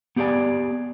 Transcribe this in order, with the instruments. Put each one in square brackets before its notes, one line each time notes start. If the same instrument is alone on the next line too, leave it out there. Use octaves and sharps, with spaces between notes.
[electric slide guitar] B3 G4 G#4 C5 D5 G#5